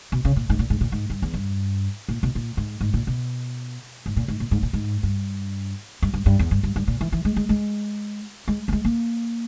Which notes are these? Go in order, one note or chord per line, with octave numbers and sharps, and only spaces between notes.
B2
C#3
A#2
G#2
A#2
G#2
A#2
G#2
G2
E2
G2
A#2
B2
A#2
G#2
G#2
A#2
B2
G#2
A#2
G#2
A#2
G#2
A#2
G#2
G2
G2
G2
G2
E2
G2
G2
G2
A#2
E3
E3
G#3
G#3
G#3
G#3
A#3
G#3
A#3